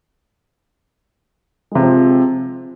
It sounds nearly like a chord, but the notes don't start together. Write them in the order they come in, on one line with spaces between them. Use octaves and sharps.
G#3 C3 F3 C4